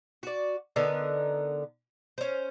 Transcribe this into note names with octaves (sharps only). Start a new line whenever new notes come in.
F#4 D5
D3 B3 D#4 A#4
C#4 C5